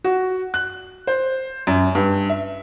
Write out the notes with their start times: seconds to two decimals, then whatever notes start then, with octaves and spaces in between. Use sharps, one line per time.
0.04 F#4
0.54 F#6
1.07 C5
1.67 F#2
1.95 G2
2.30 E5